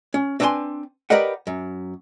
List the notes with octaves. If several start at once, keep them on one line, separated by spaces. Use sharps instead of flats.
C#4
C4 D4 B4 G5 G#5 C6
G4 A#4 B4 D5 D#5 F#5
F#2